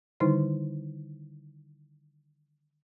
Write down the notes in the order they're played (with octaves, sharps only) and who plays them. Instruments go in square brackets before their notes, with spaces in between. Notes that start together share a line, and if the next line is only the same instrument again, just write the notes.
[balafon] D3 D#3 G3 D#4 E4